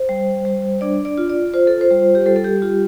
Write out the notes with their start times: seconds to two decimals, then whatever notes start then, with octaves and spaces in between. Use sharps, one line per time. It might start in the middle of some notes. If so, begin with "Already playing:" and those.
Already playing: C5
0.09 G3
0.45 G3
0.81 D4 D5
1.05 D5
1.18 F4
1.30 D5
1.54 F4 C5
1.67 A4
1.81 C5
1.91 G3
2.15 G4
2.26 G3 A4
2.36 A4
2.44 G4
2.62 F4 G4